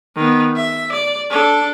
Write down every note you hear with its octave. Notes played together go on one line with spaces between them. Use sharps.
D#3 B3
E5
D5
D4 A4